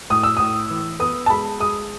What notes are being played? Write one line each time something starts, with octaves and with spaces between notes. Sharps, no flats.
A2 D#6
E6
A2 D#6
E3
B3 D#6
A5
G#3 B5
G#3 D#6